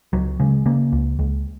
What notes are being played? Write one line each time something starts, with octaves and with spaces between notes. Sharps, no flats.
C#2 F#3
C#3 G#3
C#3 A#3
C#2
C#2